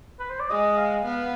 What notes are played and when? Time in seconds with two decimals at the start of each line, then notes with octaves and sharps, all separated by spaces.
0.20 B4
0.30 C5
0.40 D5
0.50 G#3 D#5
0.77 F5
1.06 B3